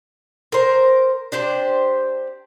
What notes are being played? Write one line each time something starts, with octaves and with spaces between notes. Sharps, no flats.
A#4 C5
D4 G4 C5